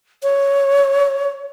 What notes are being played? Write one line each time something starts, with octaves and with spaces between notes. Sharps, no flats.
C#5